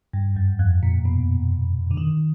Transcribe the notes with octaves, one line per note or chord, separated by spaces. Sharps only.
G2
F#2
F2
A#2
B2
D3
D#3